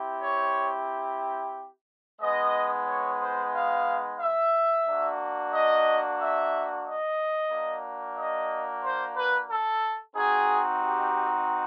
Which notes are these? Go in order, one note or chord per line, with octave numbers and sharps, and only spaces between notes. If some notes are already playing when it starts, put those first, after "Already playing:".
Already playing: C4 E4 G4
C#5
G#3 B3 D#4 D#5
C#5
C5
F5
E5
A#3 D4 F#4
D#5
E5
D#5
A#3 D4 F#4
D#5
C5
B4
A4
C4 D#4 F#4 G#4
G4